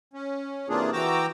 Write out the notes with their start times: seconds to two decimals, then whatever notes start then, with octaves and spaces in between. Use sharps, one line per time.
0.14 C#4
0.69 C3 E3 A#3 D4 F4 G#4
0.93 E3 F#4 G5 A#5 D6 E6